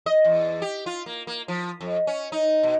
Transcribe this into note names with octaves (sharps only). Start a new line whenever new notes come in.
D#5
E2
G4
F4
A#3
A#3
F3
F2
C#4
D#4
B2